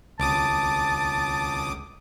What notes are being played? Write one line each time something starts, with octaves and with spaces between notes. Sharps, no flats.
C#2 A5 D6 D#6